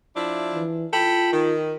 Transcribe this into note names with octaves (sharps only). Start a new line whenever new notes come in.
F3 D4 E4
E3
F4 A4 G5 B5
D#3